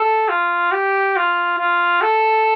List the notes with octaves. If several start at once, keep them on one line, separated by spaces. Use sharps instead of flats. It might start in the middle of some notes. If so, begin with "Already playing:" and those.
Already playing: A4
F4
G4
F4
F4
A4